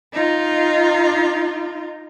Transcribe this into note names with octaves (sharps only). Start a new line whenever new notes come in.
D#4 F4